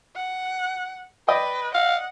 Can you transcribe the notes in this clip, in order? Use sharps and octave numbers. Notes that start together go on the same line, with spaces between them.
F#5
B4 D5 D#5 G5
F5 F#5